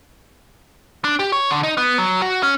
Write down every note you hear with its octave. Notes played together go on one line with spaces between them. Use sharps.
D4
G4
C#5
D3
D#4
B3
F#3
F#4
C#4